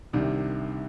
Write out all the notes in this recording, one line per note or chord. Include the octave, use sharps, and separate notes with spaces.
C2 C3 D#3 D4